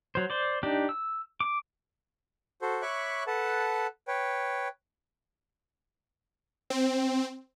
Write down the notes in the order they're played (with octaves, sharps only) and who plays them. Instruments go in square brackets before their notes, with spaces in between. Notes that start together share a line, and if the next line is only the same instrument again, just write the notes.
[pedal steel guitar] F#3 C5
C5 D5
D4 D#4 G4
E6
D6
[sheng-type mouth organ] F#4 A4 C5
C#5 E5 B5 C#6 D6 F#6
A4 B4 F#5 A5
B4 C#5 G5
[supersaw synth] C4